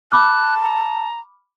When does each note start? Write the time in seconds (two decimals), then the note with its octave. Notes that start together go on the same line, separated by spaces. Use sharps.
0.12 A5 B5 D6 F6 F#6
0.62 A#5